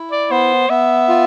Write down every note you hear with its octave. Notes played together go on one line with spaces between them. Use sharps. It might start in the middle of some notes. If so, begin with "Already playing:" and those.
Already playing: E4
D5
B3 C5
B3 E5
F4